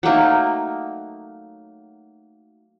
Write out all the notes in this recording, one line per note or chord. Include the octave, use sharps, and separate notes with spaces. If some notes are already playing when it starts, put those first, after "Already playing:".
F#3 A3 A#3 D#4